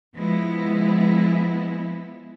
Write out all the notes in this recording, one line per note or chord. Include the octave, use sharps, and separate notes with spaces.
F3 G#3 B3 E4